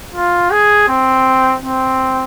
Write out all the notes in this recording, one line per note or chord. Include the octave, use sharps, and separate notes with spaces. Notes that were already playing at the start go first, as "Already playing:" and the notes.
F4
G#4
C4
C4